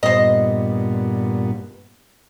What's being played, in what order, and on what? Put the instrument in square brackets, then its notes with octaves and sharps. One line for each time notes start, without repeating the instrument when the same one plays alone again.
[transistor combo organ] G2 A#2 B3 [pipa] C5 D#5